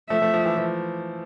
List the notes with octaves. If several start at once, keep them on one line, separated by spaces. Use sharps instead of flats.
F3 A3 E5
F3 A3
F3
E3
F3